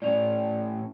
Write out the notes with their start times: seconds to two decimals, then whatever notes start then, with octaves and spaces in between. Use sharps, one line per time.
0.02 A2 C#4 D5 F7